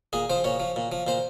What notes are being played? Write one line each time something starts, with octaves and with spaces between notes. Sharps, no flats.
A#2 G#4
F3 C5
A#2 C#5
F3
A#2
F3
A#2 C5